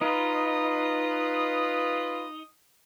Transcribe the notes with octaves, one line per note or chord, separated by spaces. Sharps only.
D#4 F4 B4 D#5 D#6